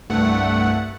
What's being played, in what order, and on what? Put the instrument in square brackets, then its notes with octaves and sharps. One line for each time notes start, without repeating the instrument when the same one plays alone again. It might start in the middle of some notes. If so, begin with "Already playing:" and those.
[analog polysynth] C2 G2 A3 F#5